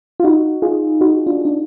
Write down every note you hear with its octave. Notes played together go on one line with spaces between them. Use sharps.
F4
D#4 F#4
F4 G#4
D#4 F#4
D4 F4
D4